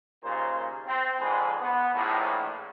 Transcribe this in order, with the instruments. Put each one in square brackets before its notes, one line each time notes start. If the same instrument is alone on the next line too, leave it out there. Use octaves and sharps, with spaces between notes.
[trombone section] D#2 A#2 C#3 A#3 C5
C4
F2 G#2 D3 G#4 B4 C5
B3
A#1 A2